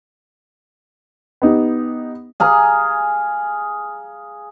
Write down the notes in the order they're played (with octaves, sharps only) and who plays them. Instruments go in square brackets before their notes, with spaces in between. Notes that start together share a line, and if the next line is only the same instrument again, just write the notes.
[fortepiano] B3 D#4 G4
[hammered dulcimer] G#4 F5 A#5